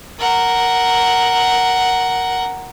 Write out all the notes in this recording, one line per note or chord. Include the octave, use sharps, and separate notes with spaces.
A#4 F#5